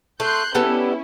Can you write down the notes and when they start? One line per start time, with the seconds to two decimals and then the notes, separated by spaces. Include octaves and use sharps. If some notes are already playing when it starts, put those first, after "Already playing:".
0.20 A3 C6 F#6 G6
0.55 G3 B3 C#4 E4 A4